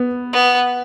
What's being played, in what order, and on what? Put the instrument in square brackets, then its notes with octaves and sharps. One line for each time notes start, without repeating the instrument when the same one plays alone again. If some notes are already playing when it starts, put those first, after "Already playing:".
Already playing: [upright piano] B3
[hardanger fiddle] B3